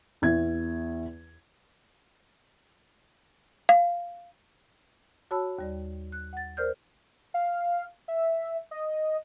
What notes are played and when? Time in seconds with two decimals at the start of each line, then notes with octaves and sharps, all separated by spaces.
0.22 E2 E4 G#6
3.69 F5
5.31 F#4 C#5 A5 B5 E6
5.59 D#2 G3 D5
6.12 F#6
6.33 F#5 A6
6.57 A#4 C5 D5 F6 G6
7.34 F5
8.08 E5
8.71 D#5